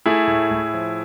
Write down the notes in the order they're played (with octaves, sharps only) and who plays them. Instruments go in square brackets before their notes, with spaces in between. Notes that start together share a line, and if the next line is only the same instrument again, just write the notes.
[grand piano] A3 E4 G#4
A2
A2
F3